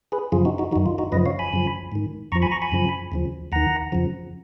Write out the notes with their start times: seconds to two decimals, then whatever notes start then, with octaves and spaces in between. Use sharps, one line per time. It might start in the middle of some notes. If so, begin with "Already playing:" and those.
0.12 G#4 B4
0.32 F#2 C#3 F3 F4 G#4
0.45 D#4 F#4
0.58 D#4 F#4
0.72 D#3 D#4 F#4
0.76 F#2
0.86 F4
0.98 D#4 F#4
1.12 F#2 C#3 F3 B4 D#5
1.26 C#5 F5
1.39 G#5 B5
1.53 F#2 C#3 F3
1.92 G#2 D#3
2.32 F2 A#5 C#6
2.35 F3
2.42 G#5 B5
2.51 A#5 C#6
2.62 G#5 B5
2.72 F#2 C#3 F3
3.12 D#2 C#3 F3
3.52 D#2 D#3 F#5 A#5
3.92 F2 C#3 F3